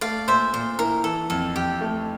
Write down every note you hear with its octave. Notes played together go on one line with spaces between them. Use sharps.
A3 D5 F5
A#2 C5 E5
A#2 C5
E4 A#4
E3 A4
F2 A4
F2 G4
A3